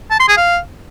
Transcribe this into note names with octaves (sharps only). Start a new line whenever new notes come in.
A5
C6
G#4
F5